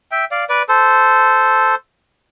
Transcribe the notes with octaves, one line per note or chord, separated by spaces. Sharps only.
E5 G5
D5 F5
B4 D5
A4 C5